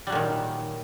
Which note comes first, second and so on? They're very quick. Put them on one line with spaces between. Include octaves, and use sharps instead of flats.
G3 F#3 A#2 D#3